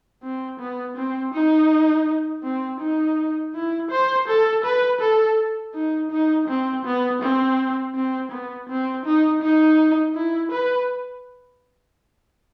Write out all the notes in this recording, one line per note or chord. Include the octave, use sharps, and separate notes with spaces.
C4
B3
C4
D#4
C4
D#4
E4
C5
A4
B4
A4
D#4
D#4
C4
B3
C4
C4
B3
C4
D#4
D#4
E4
B4